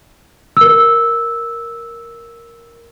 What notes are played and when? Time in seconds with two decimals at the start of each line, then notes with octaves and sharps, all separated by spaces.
0.57 A#4 E6